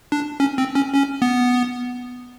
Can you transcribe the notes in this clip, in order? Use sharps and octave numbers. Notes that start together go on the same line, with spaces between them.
D4
C#4
C4
C#4
C#4
B3